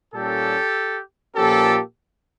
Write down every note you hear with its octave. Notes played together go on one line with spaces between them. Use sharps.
A#2 G3 A#3 C#4 G4 A4
A#2 F3 A#3 C#4 G4 A4